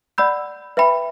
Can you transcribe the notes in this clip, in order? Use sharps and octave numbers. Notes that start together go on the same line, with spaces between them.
D5 F#5 B5 E6 G6
B4 E5 G5 B5